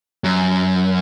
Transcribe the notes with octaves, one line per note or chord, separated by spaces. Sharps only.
F#2